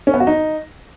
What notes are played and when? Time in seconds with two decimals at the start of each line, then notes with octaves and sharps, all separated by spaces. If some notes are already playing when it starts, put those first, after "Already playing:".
0.07 C#4
0.14 B3
0.20 F#4
0.27 D#4